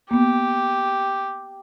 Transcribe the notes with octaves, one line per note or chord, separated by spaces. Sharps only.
A#3 B3 G4